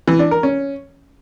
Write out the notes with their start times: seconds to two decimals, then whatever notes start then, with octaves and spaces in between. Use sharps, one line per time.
0.08 E3
0.19 D4
0.31 A#4
0.43 C#4